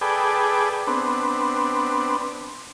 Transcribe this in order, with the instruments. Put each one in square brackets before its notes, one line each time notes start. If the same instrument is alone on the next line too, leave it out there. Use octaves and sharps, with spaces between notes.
[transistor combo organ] G#4 A4 B4 D5 G5
B3 C4 D4